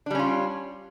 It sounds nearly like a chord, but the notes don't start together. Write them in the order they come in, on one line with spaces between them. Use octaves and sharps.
D4 G3 C#4 F4